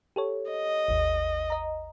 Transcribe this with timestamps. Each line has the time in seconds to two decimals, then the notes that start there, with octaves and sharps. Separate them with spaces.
0.16 G4 A4 C#5
0.51 D#5
0.88 G#1 D#2
1.50 D#5 A#5